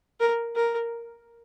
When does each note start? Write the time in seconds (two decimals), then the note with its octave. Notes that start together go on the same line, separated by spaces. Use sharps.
0.20 A#4
0.55 A#4